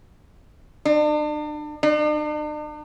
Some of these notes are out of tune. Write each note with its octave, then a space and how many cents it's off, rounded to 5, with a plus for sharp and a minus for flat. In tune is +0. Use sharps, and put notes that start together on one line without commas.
D4 +40
D4 +45